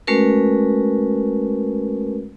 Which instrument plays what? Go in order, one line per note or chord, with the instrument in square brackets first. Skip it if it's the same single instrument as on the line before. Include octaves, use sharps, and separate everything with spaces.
[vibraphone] G#3 A3 C#4 F#4 A#4 B4